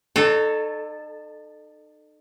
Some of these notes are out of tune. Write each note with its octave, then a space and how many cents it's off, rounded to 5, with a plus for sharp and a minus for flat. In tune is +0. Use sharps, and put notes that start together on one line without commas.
D#4 -40 A4 +0 C#5 +0